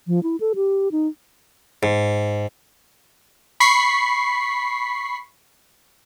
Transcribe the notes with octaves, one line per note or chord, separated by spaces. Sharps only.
F3
E4
A4
G4
D#4
G#2
B5 C#6 B6 C7